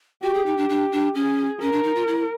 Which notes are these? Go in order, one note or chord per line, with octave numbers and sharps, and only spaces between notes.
F#4 G4
G#4
D#4
D4
D4 G4
D4
C#4 G#4
C#4 A#4
D4
D#4
F4
E4